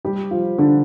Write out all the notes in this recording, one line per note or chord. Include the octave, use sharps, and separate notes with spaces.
G3 G4
F3 F4
D3 D4